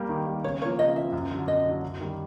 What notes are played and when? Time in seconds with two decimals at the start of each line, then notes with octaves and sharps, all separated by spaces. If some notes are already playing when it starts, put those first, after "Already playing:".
Already playing: G3 A#3
0.09 D#3
0.26 G3 A#3
0.44 C#3 C#5
0.61 A#3 C#5
0.65 F3
0.79 C#3 D#5
0.96 F3 A#3 E5
1.13 F#2
1.31 D3 F#3
1.47 F#2 D#5
1.65 D3 F#3
1.82 F#2
2.00 D#3 G3